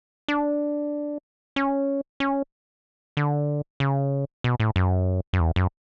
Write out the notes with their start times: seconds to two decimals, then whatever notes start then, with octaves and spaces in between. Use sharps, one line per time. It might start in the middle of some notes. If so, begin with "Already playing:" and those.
0.28 D4
1.56 C#4
2.20 C#4
3.17 D3
3.80 C#3
4.44 B2
4.60 A2
4.76 F#2
5.33 F#2
5.40 E2
5.56 F#2